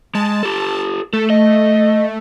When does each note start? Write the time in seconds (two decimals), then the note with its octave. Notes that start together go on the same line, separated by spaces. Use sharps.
0.15 G#3 A5
0.43 G4 A4
1.13 A3 A4
1.30 D#5